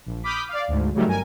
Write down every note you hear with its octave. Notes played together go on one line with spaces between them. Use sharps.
A#1
B5 D6 D#6 F6 G6 B6
D5 F5
D2 G#2
C#3 F#3 G3 A3 D#4 A#4
G1 A#4 G#5